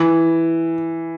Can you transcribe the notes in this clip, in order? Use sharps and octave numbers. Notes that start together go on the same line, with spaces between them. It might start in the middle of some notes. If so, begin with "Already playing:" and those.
Already playing: E3